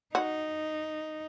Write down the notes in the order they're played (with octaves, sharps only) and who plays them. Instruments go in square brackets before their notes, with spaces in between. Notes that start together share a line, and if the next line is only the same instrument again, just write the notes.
[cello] D#4 [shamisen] F#4